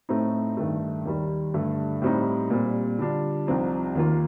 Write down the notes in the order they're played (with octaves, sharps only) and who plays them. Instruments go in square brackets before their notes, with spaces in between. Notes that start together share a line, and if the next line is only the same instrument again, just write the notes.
[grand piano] A2 A3 C4 D#4
G2 D#3 A3
D#2 D#3 G3
G2 D3 A3
A2 G3 C4 D#4
A#2 G3 C4
D3 G3 D4 F4
C2 C3 F3 C4 D#4
D#2 D#3 A#3 F4